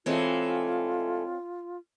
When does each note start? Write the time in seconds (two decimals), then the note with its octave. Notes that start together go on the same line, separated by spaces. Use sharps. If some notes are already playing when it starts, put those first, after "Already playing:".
0.06 E3 G#3 A3 C4 F4 C#5